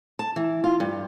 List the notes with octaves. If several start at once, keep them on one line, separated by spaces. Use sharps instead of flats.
A5
E3
F4
G2